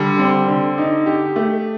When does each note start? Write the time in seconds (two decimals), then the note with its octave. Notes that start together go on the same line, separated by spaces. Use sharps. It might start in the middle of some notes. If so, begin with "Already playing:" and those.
Already playing: D3 G3
0.19 C4
0.48 D3
0.78 D#4
1.06 G4
1.36 A3